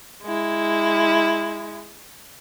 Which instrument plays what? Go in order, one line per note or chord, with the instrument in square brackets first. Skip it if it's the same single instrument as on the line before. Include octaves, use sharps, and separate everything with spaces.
[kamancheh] G#3 E4